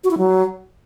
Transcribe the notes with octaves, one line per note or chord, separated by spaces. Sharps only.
F#4
E4
F#3